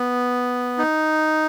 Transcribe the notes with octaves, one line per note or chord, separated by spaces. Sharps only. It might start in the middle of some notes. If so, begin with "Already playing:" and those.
Already playing: B3
D#4